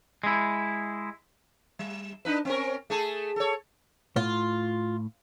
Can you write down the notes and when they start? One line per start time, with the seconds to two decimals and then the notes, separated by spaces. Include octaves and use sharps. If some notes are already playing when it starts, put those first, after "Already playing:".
0.24 G#3 E4
1.79 G3
2.25 D4 D#4 B4
2.45 C4 C#4 A#4
2.90 A3 G#4 A4
3.36 A4 C#5
4.16 A2 F4